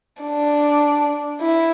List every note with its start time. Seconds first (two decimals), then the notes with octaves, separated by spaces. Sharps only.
0.23 D4
1.41 E4